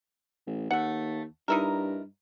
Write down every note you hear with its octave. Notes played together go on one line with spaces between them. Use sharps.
A1
D#2 A3 F#5
G2 D#4 E4 A#4